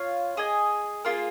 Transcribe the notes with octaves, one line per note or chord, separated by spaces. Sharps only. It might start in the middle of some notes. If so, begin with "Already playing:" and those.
Already playing: F4 C#5 F5
G#4 D#5 G#5
A#3 F4 G#4